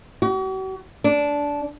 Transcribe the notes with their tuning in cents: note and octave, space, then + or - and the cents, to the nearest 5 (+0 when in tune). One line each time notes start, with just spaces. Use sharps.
F#4 +45
D4 -15